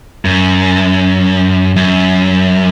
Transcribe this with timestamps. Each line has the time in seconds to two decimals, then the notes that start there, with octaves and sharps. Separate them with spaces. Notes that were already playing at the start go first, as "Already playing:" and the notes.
0.25 F#2
1.76 F#2